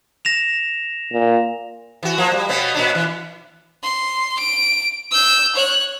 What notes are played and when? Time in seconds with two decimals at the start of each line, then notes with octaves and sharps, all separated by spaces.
0.25 A#6 E7 F7
1.13 A#2
2.03 E3 F#4
2.18 F3 A#3
2.32 G3
2.49 B2 B3 C#4
2.74 A#2 C#4 D4
2.95 E3
3.83 C6
4.39 D7
5.11 E6 G6
5.55 C#5 F#6